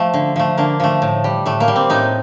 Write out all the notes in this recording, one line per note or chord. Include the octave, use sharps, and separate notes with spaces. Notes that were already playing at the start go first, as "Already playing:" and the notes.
Already playing: F3 A3
D3
F3 A3
D3 A#3
F3 A3
A2
G3
A2 A3
A#3
G3
C4
A2 D#4